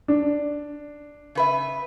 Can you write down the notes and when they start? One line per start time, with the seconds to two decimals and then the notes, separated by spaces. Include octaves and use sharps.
0.08 D4
1.35 C#3 B4 E5